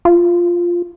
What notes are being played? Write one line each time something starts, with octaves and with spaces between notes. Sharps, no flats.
F4